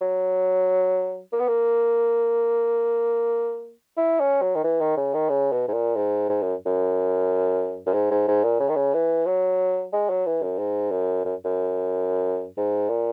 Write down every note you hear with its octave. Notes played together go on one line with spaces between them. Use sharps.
F#3
A#3
B3
A#3
E4
C#4
F#3
D#3
E3
D#3
C#3
D#3
C#3
B2
G#2
A#2
G#2
G#2
F#2
F#2
F#2
G#2
G#2
G#2
A#2
C#3
D#3
C#3
E3
F#3
G#3
F#3
E3
F#2
G#2
F#2
F#2
F#2
G#2
A#2